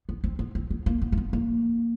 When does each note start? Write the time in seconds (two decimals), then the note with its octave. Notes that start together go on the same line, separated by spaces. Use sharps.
0.09 B3
0.24 C4
0.39 B3
0.55 C4
0.71 B3
0.86 A#3
1.02 B3
1.12 A#3
1.18 B3
1.33 A#3